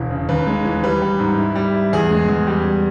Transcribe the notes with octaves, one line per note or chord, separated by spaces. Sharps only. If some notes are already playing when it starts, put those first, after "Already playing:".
Already playing: E1 E3
C#3
D#2 B4
G#3
E3
G3 B4
G3
G#2
E4
G3
E4
E2 G#4
G#3
E2
G3
G3